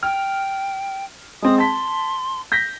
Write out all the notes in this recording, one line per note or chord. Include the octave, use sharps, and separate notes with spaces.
G5 F6
G#3 C4 D#6
A5 C6 B6
G6 A#6 B6